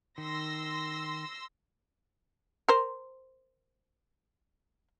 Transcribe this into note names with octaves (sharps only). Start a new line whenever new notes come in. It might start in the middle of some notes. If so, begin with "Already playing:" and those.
D#3 C6 E6 A#6
A#4 C5